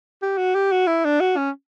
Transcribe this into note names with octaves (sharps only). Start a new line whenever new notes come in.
G4
F#4
G4
F#4
E4
D4
F#4
C#4